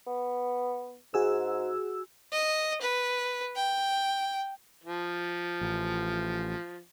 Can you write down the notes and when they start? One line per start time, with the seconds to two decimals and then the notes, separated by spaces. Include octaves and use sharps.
0.07 B3
1.14 G#2 F#4 G#4 E6
2.32 D#5
2.82 B4
3.55 G5
4.84 F3
5.61 A1